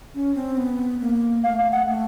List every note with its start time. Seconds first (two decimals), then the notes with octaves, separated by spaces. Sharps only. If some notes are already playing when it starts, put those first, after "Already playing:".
0.14 C#4
0.35 C4
0.57 B3
1.00 A#3
1.44 A3 F5
1.72 F#5
1.87 A3